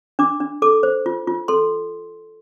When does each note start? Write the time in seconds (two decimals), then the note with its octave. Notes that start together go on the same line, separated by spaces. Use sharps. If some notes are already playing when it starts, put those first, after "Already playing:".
0.19 D4 D6
0.40 D4
0.62 A4 D6
0.83 C5
1.06 F4
1.27 F4
1.48 A4 C6